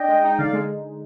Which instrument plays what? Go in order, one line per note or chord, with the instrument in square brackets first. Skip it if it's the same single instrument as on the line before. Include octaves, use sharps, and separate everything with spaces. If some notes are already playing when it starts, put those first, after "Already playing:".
Already playing: [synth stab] D4 [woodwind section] D#5 G5
[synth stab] G#3
D#4
[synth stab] D3 [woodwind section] D5 F5
[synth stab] G#3